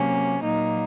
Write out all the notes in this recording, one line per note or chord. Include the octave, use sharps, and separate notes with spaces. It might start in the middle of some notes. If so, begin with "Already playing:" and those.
Already playing: C3 F#3 A#3 C#4
A#2 F#3 A#3 D#4